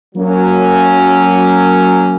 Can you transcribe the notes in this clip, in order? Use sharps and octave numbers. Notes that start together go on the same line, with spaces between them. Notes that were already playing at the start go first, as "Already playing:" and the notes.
F#3 A#3 C#4